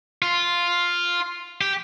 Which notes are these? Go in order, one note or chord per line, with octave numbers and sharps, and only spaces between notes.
F4
G4